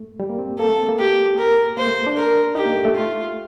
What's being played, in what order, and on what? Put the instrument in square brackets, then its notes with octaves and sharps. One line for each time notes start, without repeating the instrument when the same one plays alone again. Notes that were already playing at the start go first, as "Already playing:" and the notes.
Already playing: [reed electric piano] A3
G3
A#3
C4
[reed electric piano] A#3 [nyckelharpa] A4
[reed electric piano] A3
C4
A#3
[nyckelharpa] G4
A#4
[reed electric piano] A#3 [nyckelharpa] C5
[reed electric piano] A3
D4
[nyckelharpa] A#4
[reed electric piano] D#4 [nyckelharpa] G4
[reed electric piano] A#3
A3
A3
[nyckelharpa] F4